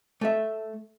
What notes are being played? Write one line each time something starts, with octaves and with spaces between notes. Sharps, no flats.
A3 E5